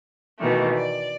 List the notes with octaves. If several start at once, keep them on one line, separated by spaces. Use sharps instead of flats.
B2 D#3 E3 A3
D5